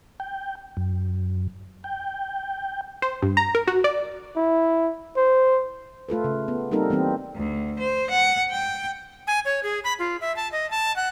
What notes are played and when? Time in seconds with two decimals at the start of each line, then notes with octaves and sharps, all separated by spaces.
0.20 G5
0.77 F#2
1.84 G5
3.02 C5
3.22 G2
3.37 A#5
3.55 A#4
3.68 F#4
3.84 D5
4.36 E4
5.17 C5
6.09 A3 F4 A4 B4
6.24 C#3
6.48 B3
6.71 G3 A#3 C4 D#4 A4 A#4
6.90 E3 G3 A#3 C4
7.36 D2
7.79 C5
8.10 F#5
8.51 G5
9.27 G#5
9.45 C#5
9.63 G#4
9.84 B5
9.99 F4
10.21 E5
10.36 A5
10.52 D#5
10.71 A5
10.96 F#5